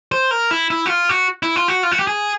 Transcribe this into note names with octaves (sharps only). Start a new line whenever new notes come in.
C5
A#4
E4
E4
F#4
F4
F#4
E4
F4
F#4
F4
F#4
G4
G#4